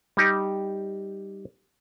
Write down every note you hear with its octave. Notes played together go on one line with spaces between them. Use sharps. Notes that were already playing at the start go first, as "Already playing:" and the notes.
G3 D#4 G4